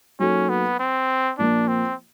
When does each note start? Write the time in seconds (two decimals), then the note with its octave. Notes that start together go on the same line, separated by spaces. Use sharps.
0.19 F#3 A#3 C#4 D#4 F#4 A4
0.49 B3
0.80 C4
1.39 A#2 F3 A#3 D4
1.68 C4